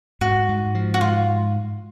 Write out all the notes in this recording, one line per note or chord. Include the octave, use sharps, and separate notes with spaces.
G#2 F#4
G#2
F3
F#4
G#2 F4